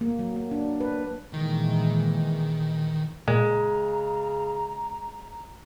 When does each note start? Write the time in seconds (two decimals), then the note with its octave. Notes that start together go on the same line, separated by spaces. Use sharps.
0.01 A#3
0.19 F#3
0.36 A#3
0.51 D4
0.80 B4
1.33 A#2 D#3 E3 G#3
3.28 A#2 C#3 G#3 A#5